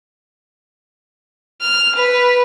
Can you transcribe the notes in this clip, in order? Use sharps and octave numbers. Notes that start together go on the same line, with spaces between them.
F6
B4